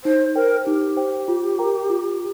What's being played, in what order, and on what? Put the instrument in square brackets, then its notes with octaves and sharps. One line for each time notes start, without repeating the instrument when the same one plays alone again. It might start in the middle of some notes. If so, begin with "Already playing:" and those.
[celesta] D#4 [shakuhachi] C5
[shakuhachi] A#4 [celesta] C5 G5
[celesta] D#4 [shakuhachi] G4
[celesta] C5 G5
F4
A#4 G5 A#5
F4